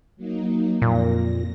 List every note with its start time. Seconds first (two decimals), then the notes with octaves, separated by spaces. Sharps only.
0.17 F#3 A#3 D#4
0.82 F2 A#2 A#6